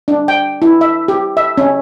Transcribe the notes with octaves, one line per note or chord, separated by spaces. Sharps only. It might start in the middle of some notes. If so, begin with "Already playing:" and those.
D4
G5
E4
E5
G4
E5
C#4